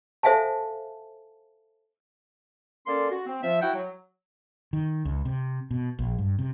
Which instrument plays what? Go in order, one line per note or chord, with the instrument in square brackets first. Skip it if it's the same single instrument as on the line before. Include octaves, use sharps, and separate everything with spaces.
[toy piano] A4 C5 E5 F5 G#5 A5
[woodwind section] A#3 C#4 A4 D5 C6
F#4
C4
F3 E5
E4 F#4 F#5 G5
F#3
[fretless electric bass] D#3
C#2
C3
B2
A#1
G2
C3